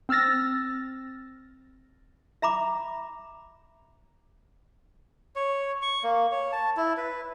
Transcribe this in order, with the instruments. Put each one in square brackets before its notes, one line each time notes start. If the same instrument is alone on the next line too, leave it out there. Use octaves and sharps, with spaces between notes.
[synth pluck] C4 E6 F6 A6 A#6
[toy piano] E5 A#5 B5 D6
[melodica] C#5
C#6
A#3
C#5
A5
E4
B4